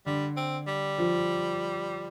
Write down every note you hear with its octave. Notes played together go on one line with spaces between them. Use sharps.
D3 G3
C4
G3
F3